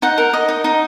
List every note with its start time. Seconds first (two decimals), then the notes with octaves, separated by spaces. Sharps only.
0.02 D#4 F#5
0.18 A#4
0.33 D#5
0.49 D#4
0.64 D#4